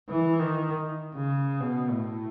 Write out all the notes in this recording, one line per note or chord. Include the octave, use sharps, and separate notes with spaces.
E3
D#3
C#3
B2
A2